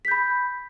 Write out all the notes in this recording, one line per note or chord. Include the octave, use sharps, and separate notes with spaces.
B5 G6 B6